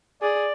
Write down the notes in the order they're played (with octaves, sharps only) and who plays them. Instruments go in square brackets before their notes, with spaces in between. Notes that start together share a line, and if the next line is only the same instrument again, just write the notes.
[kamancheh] G#4 [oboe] D5